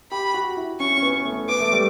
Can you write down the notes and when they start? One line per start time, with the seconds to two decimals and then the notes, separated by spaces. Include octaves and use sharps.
0.11 G4 B5
0.34 F#4
0.57 E4
0.80 C#4 C#6
0.98 C#4
1.02 B3
1.15 B3
1.25 A3
1.49 B3 D6
1.60 A3
1.72 G3